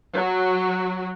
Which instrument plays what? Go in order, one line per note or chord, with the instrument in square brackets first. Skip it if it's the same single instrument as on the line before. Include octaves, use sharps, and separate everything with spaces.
[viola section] F#3